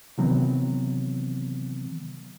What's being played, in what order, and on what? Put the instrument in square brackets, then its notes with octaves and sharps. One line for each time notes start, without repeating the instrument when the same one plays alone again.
[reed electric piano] C3 D#3 E3 F#3 B3 C4